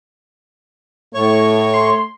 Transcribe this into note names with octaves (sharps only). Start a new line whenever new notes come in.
A2 A3 C#5 C#6
C6